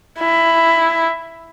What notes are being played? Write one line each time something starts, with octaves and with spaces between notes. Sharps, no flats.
E4